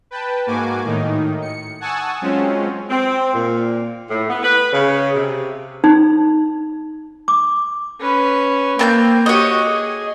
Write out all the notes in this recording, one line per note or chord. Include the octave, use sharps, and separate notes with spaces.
B4 G5 A5
G#2 A#3 F#4 G#5 D6
A2 D#3 D#4
C#7
F#5 G#5 A5 C#6 D#6 E6
F#3 G#3 C4 C#4 F4
C4
A#2
A2
B3
B4
C#3
C3
D#4
D6
C#4 B4
A#3 C4 A5 G6
F#4 G4 C#5 D#5
G#4